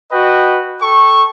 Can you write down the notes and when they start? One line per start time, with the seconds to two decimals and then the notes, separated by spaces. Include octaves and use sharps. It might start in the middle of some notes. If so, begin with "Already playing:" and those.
0.12 F#4 B4 D#5 G5
0.81 A4 G5 C#6